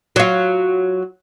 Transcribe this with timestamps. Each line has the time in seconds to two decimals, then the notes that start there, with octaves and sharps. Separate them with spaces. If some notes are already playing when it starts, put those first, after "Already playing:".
0.16 F#3 F4